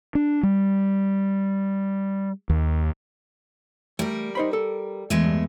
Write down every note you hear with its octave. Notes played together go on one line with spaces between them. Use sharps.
D4
G3
D#2
G3 A3 A#4
D#4 C5 B5
A4
E2 G#3 A3
G2